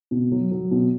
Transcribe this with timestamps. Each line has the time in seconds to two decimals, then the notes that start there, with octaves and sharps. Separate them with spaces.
0.11 B2
0.32 F#3
0.51 F#3
0.71 B2